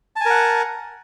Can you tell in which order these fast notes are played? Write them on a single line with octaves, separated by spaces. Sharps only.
A5 G#5 A#4 F#5